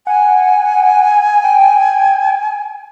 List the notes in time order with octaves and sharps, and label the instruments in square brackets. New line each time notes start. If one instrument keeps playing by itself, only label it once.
[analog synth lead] F#5 [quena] G#5
[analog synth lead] G5